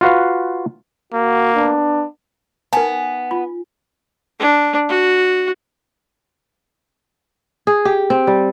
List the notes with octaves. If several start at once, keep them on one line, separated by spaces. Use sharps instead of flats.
F4 F#4 B4 F5
A#3 F#4
B3 D4
B3 D#4 A#4 G#5 A5
F4 B5
D4
F#4
G#4
G4
C4
G3